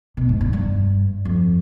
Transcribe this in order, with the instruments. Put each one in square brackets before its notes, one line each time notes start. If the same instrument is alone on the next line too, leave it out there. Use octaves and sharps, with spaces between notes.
[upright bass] B2
G#2
G2
G#2
G2
F2